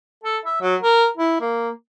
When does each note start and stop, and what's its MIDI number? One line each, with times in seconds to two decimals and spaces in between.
0.24 0.38 69
0.45 0.57 76
0.62 0.75 54
0.82 1.07 70
1.17 1.37 64
1.41 1.70 58